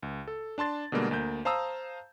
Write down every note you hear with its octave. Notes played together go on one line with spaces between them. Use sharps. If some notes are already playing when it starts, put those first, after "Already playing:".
C#2
A4
D4 A5 C6 A6
B2 D3 G3 G#3 A#3
D2 A#3 G6
C5 F5 A5 A#5 D#6 E6